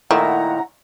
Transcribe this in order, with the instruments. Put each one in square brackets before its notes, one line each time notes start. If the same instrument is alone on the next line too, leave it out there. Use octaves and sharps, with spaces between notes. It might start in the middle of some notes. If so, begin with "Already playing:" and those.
[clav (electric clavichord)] A#2 D#3 [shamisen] A3 [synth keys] E4 [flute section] F#5 A#5